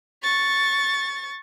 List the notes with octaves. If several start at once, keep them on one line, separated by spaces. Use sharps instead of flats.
C#6 A6